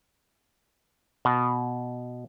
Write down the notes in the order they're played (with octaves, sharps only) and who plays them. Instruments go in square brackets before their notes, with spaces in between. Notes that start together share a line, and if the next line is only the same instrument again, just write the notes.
[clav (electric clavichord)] B2